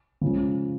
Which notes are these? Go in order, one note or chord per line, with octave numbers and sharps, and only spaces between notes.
C#3 F3 G#3